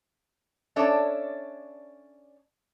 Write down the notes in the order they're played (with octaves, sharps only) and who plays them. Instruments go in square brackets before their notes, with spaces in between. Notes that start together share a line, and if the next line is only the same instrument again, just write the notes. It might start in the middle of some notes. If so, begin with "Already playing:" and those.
[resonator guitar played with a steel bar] C#4 D4 A4 C#5 D5 E5